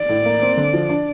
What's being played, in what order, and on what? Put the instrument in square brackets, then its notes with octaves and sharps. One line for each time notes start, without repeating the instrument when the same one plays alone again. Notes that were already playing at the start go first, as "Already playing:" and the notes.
Already playing: [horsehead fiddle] D5
[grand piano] A2
A#3
C4
D3
F3
D4